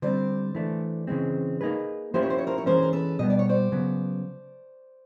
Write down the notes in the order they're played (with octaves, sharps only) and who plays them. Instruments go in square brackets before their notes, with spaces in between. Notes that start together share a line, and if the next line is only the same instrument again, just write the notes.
[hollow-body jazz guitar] D3 G3 C4 [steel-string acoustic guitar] C5 D5
[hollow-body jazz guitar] E3 A3 D4
C#3 E3 G#3 C4
A#3 D#4 G#4 B4
[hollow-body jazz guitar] F3 A#3 C#4 E4 G4 [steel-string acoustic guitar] C5
[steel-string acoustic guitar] C#5
C5
C#5
A#4 C5
C#5
[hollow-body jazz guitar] E3 G#3 C#4 [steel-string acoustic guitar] A#4 C5
[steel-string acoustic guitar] A#4
A4 B4
[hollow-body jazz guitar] B2 G3 B3 [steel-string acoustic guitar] D#5
[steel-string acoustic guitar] D5
C#5
C5 D5
[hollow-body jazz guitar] C#3 F#3 B3